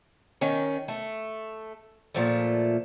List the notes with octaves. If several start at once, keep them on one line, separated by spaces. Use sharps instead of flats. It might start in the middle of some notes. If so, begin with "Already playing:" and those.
D#3 C#4
A3
A#2 F3 A3